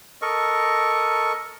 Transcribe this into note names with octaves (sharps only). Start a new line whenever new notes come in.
A4 A#4 D#5 C#6